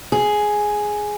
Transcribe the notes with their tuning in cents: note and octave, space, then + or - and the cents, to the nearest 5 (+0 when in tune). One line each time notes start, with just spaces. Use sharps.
G#4 +5